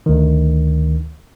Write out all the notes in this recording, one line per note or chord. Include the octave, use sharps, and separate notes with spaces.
D2 D#3